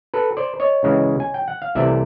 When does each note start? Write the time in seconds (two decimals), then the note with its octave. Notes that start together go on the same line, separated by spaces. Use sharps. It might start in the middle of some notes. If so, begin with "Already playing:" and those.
0.14 A4 B4
0.37 C5 D5
0.60 C#5 D#5
0.83 C#2 C#3 E3 G#3
1.20 G#5
1.34 G5
1.48 F#5
1.62 F5
1.75 C2 C3 E3 A3 D5 E5